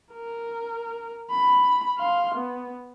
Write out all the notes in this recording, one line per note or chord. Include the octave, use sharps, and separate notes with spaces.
A#4
B5
F5 C6
B3